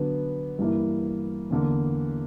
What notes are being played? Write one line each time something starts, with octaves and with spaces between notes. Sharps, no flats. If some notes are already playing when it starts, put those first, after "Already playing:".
Already playing: D3 F#3 B3 D4
G2 E3 A#3 E4
E2 D3 A#3